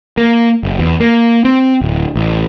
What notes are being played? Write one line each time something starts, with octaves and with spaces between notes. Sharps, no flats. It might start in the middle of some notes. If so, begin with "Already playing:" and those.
A#3
F#1
E2
A#3
C4
D1
A1